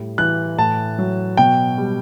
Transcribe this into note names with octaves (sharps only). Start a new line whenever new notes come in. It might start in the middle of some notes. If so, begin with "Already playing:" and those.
Already playing: A2 G3
E3 F#6
A2 A5
F#3
B2 G5
G3